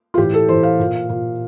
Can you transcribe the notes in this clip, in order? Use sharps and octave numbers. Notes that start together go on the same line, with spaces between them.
F4
A2 E3 G4
A4
A2 E3 C5
F5
A#2
A#2